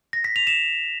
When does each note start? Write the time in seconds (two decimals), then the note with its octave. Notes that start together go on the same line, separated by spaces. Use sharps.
0.13 A#6
0.24 B6
0.36 F7
0.47 E7